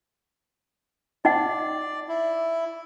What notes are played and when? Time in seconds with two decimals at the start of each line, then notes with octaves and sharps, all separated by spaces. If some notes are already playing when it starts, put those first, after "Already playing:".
1.25 D#4 D5 D#5 F#5
2.08 E4